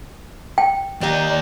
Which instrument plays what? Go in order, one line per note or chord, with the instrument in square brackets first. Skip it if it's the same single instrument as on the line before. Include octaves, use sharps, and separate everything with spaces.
[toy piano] G5
[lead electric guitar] D#2 G4 [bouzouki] D5 D#5 A#5